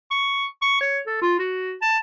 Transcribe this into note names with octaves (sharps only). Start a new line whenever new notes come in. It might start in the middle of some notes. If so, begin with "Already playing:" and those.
C#6
C#6
C#5
A4
F4
F#4
A5